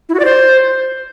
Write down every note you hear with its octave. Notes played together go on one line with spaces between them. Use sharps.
E4
F#4
D5
C5